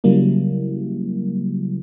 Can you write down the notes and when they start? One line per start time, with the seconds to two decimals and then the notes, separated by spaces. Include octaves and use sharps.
0.04 C#3 F#3 G3 A#3 E4